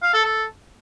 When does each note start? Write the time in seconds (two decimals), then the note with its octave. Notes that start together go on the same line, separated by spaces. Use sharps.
0.02 F5
0.13 A4
0.24 A4